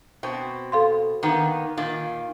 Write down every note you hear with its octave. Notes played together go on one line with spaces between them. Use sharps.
B2 C4
A4 F5 C6
D#3 A#3 B3
A#2 D#3 F4